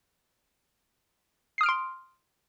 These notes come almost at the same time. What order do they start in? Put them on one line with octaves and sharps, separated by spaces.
C7 D#6 F6 D7 C6